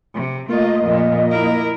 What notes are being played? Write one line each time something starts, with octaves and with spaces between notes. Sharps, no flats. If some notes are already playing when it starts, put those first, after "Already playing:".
C3
A3 A#3 F4 D#5
F2 A#2
E4 A#4